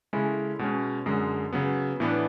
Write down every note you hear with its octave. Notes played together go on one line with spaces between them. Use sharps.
C#3 G#3 C#4 E4 A4
B2 G#3 C#4
F#2 D3 G#3
C#3 F#3 B3
A2 E3 B3 D4